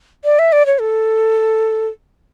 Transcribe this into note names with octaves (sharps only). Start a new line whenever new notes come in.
D5
E5
D5
C#5
A4